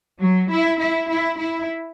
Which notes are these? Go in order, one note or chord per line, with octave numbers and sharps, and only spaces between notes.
F#3
E4
E4
E4
E4